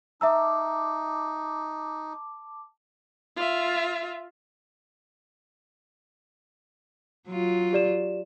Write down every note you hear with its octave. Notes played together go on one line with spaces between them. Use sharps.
D#4 E5 A5 A#5 D6 E6
F4 E5
F#3 F4
G4 D5 E7